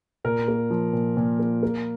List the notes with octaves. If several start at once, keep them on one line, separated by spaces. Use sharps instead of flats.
A#2 A#4
A#3
F3
A#2
A#2
A#3
A#3